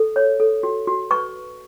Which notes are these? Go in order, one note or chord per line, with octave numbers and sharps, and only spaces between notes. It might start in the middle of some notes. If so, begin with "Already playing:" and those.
Already playing: A4
C#5
A4
F#4
F#4
B4 C#6